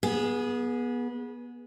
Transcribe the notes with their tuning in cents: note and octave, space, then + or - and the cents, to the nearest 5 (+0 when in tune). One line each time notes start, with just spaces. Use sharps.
B3 -25 G#4 +0